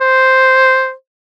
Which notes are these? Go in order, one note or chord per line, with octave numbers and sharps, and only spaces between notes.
C5